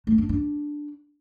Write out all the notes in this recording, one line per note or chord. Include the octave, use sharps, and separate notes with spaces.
A3
D4
D4